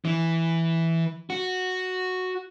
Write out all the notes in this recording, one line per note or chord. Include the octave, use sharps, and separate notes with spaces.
E3
F#4